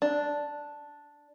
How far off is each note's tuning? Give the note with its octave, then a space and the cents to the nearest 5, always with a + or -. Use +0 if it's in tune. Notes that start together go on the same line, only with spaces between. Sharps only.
D4 +0